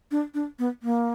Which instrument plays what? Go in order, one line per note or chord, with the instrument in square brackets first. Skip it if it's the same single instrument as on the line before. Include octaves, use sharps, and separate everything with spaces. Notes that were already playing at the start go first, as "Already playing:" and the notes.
[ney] D4
D4
B3
A#3